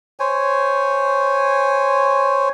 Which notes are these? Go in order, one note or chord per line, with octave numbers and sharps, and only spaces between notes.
C5 C#5 G#5